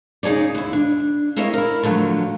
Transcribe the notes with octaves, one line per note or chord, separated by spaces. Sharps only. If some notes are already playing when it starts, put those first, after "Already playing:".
C#3 D#4 G#4 C#5 D5
D#2 E4
D4
C4 E4 A#4 C#5 D#5 F5
E4 A#4
D3 F3 F#3 A3